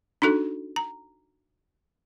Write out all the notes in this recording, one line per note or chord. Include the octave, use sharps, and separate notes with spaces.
D4 D#4 F#4 A4
A#5